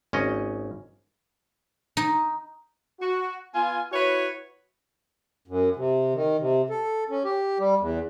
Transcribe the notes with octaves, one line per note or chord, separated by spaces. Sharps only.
G#1 C#4 D#5
D#4
F#4
B3 F4 G#5
E4 F#4 B4 C#5
F#2
C3
D#3
C3
A4
C#4
G4
G3
E2